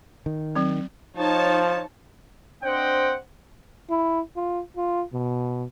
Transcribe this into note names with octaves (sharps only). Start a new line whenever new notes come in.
D#3
F#3 C4
F3 D#4 C#5 A5
C4 D4 C5 D#5 F#5 G5
E4
F4
F4
B2